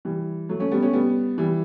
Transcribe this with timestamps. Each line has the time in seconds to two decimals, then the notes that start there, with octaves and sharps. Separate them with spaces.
0.05 E3 G3
0.49 F#3 A3
0.60 A3 C#4
0.71 G3 B3
0.82 A3 C#4
0.93 G3 B3
1.38 E3 G3